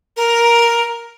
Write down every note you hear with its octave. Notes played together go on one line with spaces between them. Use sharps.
A#4